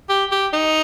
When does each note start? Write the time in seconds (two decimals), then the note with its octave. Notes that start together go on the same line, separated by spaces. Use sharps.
0.09 G4
0.32 G4
0.53 D#4